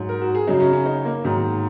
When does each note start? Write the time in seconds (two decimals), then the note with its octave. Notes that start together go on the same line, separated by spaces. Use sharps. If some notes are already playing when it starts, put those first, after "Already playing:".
Already playing: G#2 F#3
0.09 A#4
0.21 F#4
0.35 G#4
0.47 F#2 C#3 F#3 D#4
0.60 C#4
0.73 C#4
0.86 D#4
1.05 A#3
1.24 G#2 D#3 F#3